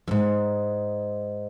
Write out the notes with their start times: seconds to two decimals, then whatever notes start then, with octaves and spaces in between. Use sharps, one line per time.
0.08 F2 G#2